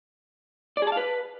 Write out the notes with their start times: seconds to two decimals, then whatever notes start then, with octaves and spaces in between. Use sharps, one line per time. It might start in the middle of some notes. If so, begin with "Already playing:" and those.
0.77 D5
0.82 G#4
0.87 A5
0.92 F5
0.97 B4